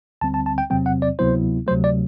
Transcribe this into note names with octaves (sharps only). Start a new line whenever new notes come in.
D2 D3 G3 C4 A5
A5
A5
G5
E2 C3 F#3 C4 G5
F#5
D5
D2 C3 F#3 B3 E4 C5
D2 C3 F#3 A3 C5
D5